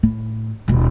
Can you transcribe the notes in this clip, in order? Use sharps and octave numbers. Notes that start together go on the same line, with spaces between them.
A2
D#1 B2